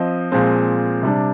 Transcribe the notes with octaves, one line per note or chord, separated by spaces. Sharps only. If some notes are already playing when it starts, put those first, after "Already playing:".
Already playing: F3 C4 D#5
A#2 F3 G#3 C4
C3 G3 D4